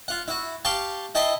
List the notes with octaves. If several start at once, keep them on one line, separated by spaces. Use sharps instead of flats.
F4 F#5
E4 F#4
G4 F5 G5 A5 C#6
E4 D#5 G5 A5 B5 C6